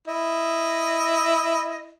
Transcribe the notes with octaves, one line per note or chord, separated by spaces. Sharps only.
E4 D#5